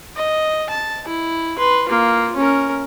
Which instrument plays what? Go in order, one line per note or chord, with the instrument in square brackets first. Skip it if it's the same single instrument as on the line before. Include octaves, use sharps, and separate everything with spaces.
[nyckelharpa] D#5
A5
E4
B4 C6
A#3 F4
C#4 A#4